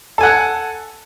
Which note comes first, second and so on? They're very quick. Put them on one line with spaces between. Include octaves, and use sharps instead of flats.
A4 G#5 F#5